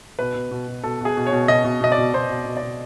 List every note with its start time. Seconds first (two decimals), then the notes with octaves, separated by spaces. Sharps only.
0.19 B2 B4
0.35 B2
0.51 B2
0.67 B2
0.83 B2 A4
1.01 B2 G#4
1.17 B2
1.27 C#5
1.32 B2
1.48 B2 D#5
1.64 B2
1.81 B2 D#5
1.92 D5
1.98 B2
2.13 B2 C5
2.29 B2
2.46 B2
2.57 D5
2.62 B2